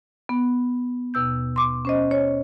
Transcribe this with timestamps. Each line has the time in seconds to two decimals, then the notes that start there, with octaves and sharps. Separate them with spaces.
0.29 B3
1.14 D#2 B2 E6 G6
1.56 C6 D6
1.85 C#4 C5 D#5
2.11 C#5